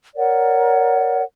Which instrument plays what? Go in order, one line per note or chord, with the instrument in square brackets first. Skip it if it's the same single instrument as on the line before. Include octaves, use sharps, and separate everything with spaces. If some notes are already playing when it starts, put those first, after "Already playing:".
[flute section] A#4 C#5 D5 F#5